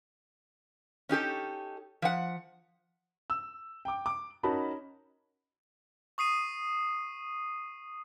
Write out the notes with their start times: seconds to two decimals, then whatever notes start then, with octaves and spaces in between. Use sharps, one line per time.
1.09 C#4 D#4 G4 A4
2.02 F3 F#5
3.30 E6
3.85 G5 D6
4.06 D6
4.43 C#4 D#4 F#4 A#4 A5 B5
6.18 C#6 D#6 C7 D#7